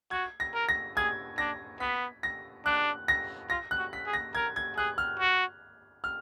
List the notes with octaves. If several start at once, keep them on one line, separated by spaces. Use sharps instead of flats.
F#4 G#6
A#6
A#4
A#6
G#4 G#6
D4 A#6
B3 B6
A#6
D4 F#6
A#6
F4 A#6
F#6
F#4
B6
G#4
A#6
A#4 G#6
G#6
G#4 F#6
F6
F#4
F6